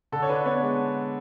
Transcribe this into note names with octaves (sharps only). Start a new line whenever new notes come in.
D3 A4
C#5
D4 B4
B3 C#5
G#3